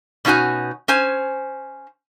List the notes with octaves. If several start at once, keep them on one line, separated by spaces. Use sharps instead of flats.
B2 C#4 D#4 F#4 G#5
C#4 C5 G#5